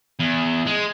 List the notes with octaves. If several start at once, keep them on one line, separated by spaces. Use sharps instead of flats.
E2
G#3